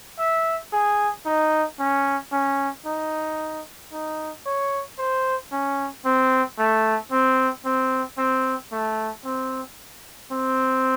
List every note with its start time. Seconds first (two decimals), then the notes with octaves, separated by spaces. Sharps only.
0.19 E5
0.73 G#4
1.26 D#4
1.79 C#4
2.32 C#4
2.86 D#4
3.93 D#4
4.46 C#5
4.99 C5
5.52 C#4
6.05 C4
6.59 A3
7.12 C4
7.65 C4
8.18 C4
8.72 A3
9.25 C4
10.32 C4